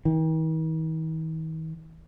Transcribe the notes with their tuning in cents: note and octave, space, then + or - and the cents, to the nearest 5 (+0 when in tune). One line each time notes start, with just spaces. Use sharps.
D#3 +45